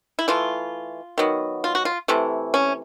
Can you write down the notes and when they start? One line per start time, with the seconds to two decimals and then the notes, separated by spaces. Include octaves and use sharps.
0.19 E4
0.28 E3 A3 F4
1.18 D#3 F#3 B3
1.64 F4
1.75 F#4
1.85 F4
2.08 C3 E3 A3
2.54 C#4